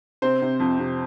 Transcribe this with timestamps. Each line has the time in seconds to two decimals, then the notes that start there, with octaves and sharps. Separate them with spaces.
0.22 C3 C5
0.42 C3
0.60 F2
0.79 C3